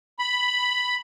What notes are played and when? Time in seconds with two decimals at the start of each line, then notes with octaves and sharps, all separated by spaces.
0.19 B5